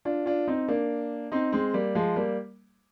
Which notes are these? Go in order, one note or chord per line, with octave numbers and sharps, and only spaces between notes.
D4 F4
D4 F4
C4 D#4
A#3 D4
C4 D#4
G#3 C4
G3 A#3
F3 G#3
G3 A#3